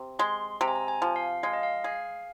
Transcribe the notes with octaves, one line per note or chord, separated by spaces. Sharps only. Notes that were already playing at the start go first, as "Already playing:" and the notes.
Already playing: C3
G#3 C6
C3 A#5
G#5
A#5
G#5
F3
F5
G#3 F5
D#5
F5
G#4